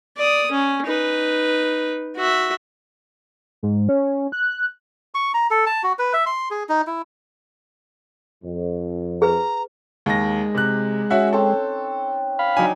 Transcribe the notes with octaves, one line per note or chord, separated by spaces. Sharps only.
D5 D#6
C#4
D#4 B4
F#4 E5
G#2
C#4
F#6
C#6
A#5
A4
A5
F#4
B4
E5
C6
G#4
D#4
E4
F2
G#4 B4 A#5
D#2 G#3 D#4 A#6
C3 F#6
C#4 F#4 E5 F#5
C4 A4 C#5
F5 B5
F#3 D4 D#4 G5 G#5